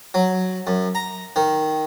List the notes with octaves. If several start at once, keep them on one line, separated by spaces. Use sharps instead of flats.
F#3
F#2
A#5
D#3